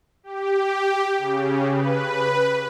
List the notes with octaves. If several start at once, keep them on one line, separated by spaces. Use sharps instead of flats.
G4
C#3
B4